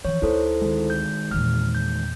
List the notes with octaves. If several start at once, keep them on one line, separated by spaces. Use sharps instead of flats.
E3 F3 C#5
D2 D#4 E4 A4 C5
D#3 G#3
G6
E2 A#2 F6
G6